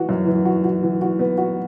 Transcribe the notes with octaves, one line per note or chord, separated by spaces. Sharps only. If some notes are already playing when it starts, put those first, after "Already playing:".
Already playing: E3 F#4
F#2
E3
F#4
F#4
E3
F#4
B3
F#4